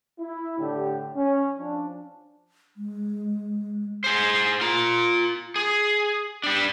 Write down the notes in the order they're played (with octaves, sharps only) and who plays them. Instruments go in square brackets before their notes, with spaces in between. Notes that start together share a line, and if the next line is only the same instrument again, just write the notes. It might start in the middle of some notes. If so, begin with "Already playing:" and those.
[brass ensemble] E4
A2 D3 G4
C#4
F3 D4
[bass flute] G#3
[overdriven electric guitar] G#4 C5
F4 A#5
G#4
G3 D4